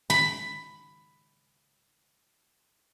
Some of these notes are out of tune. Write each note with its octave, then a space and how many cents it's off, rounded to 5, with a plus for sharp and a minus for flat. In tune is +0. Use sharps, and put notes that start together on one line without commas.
B5 +10